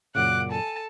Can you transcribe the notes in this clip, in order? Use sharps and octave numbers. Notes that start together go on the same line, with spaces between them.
F#2 A#2 C#3 F#5 D6 F#6
A4 G#5 A5